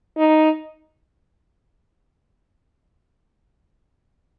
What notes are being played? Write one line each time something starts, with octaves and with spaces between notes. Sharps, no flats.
D#4